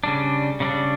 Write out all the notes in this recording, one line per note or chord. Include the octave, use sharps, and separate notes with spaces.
C#3 G3 D4
C#3 G3 D4